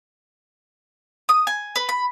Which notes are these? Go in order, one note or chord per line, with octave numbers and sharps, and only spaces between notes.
D#6
G#5
B4
B5